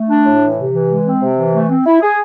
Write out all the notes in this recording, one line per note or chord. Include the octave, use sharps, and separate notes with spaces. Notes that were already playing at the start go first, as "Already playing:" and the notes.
Already playing: A3
D4
A2
E3
C3
E3
G#3
C4
C3
E3
A3
C4
E4
G#4